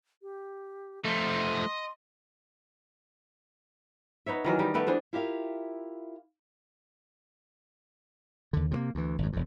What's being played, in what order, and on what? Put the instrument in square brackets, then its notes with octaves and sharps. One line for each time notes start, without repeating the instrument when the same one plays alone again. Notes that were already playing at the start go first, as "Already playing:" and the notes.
[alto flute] G4
[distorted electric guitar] F2 D#4 [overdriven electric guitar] F3 A3 [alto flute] C6
[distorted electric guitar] D#5
[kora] B3 D#4 C#5 E5
D#3 E3 F#3 A#4
G3 D#4 G4
A3 B3 G4 D5
E3 D4 G#4 C5
[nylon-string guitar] E4 F4 G4 A#4 E5 F5
[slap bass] D#2 D3
C3 G3 A#3
D2 E3
G#1 F#2
E1 F2